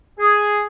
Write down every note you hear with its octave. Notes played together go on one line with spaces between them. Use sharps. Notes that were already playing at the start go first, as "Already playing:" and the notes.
G#4